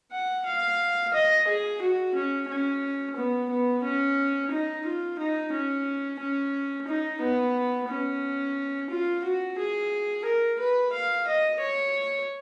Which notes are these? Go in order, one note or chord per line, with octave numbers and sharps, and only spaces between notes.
F#5
F5
D#5
G#4
F#4
C#4
C#4
B3
B3
C#4
D#4
F4
D#4
C#4
C#4
D#4
B3
C#4
F4
F#4
G#4
A#4
B4
F5
D#5
C#5